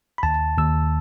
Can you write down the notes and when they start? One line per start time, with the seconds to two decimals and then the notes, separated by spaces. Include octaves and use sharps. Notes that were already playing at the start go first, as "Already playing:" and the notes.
0.18 B5
0.23 D#2 A5
0.57 D#2 E6